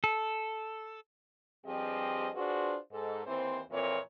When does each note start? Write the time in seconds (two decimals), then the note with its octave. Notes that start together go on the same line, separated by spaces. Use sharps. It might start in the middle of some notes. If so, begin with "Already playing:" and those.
0.04 A4
1.65 G2 F3 C4 G4 G#4 D#5
2.35 D4 F4 F#4 G#4 B4 C5
2.92 G#2 A4
3.26 D#2 E3 C4 E4 C5
3.71 F2 A#2 E3 A#3 C4 C#5